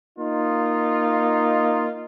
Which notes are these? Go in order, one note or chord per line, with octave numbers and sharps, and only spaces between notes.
A#3 D#4 F4